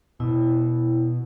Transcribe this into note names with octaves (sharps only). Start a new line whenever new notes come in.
B2 E4